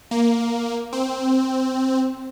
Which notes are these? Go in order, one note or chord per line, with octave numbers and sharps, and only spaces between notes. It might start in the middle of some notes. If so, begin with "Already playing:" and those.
A#3
C4